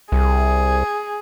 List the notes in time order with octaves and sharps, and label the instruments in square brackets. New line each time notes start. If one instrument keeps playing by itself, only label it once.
[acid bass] C2 [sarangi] G#4